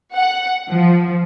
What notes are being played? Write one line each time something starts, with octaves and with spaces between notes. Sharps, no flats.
F#5
F3